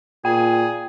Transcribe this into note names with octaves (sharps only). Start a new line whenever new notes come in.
A#2 G#4 G5